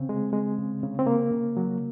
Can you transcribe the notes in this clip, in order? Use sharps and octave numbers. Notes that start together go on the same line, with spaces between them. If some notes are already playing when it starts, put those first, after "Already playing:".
Already playing: C#3 C4
G#3
G#3
C#3
C#3
C4
C#3 A#3
C#3
F#3